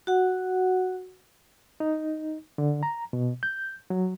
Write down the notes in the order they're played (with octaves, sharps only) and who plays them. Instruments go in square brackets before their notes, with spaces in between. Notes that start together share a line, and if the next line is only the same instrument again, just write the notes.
[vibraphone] F#4 F#5
[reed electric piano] D#4
D3
A#5
B2
G6
F#3